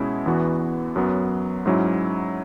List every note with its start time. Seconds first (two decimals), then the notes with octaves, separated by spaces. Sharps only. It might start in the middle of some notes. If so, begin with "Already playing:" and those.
Already playing: B2 G#3 C#4 E4
0.26 E2 E3 B3 F#4
0.96 F#2 F#3 B3
1.66 G#2 F#3 C#4 E4